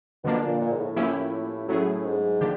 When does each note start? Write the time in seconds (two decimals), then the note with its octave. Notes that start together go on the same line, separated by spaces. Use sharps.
0.24 B2 D3 F3 A#3 D4
0.42 A#2
0.61 A#2
0.72 G#2
0.79 A2
0.96 F3 A#3 C#4 E4 G4
1.68 A2 F#3 A3 C#4 E4 G#4
2.05 G#2
2.41 D3 F3 A#3 D4 G4